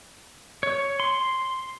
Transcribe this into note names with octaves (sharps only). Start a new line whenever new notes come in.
C#5
C6